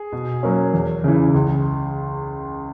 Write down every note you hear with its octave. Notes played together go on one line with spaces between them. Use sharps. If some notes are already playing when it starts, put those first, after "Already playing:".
Already playing: G#4
B2
F#3 A#3 C#4
E2
C#3 E3
C#2